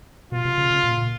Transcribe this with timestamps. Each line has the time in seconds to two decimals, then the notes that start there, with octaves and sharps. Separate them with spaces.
0.32 B2 F4
0.45 C3
0.58 C#3
0.71 C#3
0.84 A#2
0.98 A#2